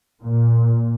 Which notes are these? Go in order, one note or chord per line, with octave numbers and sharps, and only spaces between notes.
A#2